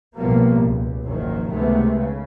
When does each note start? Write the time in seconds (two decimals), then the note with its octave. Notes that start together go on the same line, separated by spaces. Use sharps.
0.15 B1 A2 F3 G3 A#3 B3
0.63 C#2
1.05 F#1 G#2 D#3 F3 F#3
1.47 C#2 C3 D#3 G#3 A3 B3
1.95 C#3